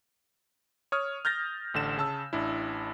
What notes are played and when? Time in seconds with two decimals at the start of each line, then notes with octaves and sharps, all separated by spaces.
0.92 C#5 D#6 F6
1.25 F6 G6 A6 A#6
1.74 A1 D3 E7
1.98 C#3 A5 E6
2.33 A1 D4 E4